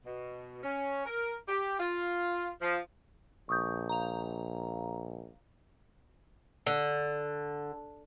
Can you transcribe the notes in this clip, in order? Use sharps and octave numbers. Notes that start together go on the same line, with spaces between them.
B2
C#4
A#4
G4
F4
F3
A#1 C#6 D#6 G6
F5 A#5
D3